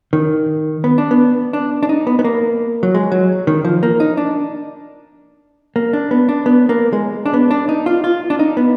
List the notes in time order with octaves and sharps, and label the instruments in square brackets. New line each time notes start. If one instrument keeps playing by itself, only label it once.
[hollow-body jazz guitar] D#3
B3
D4
B3
D4
D4
D#4
B3
B3
A#3
F#3
G#3
F#3
D#3
F3
A#3
D#4
D4
A#3
D4
B3
D4
B3
A#3
G#3
D4
B3
D4
D#4
F4
F4
D4
D#4
B3